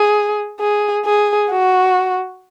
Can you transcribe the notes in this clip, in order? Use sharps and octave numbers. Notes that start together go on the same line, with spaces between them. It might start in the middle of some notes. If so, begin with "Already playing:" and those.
Already playing: G#4
G#4
G#4
F#4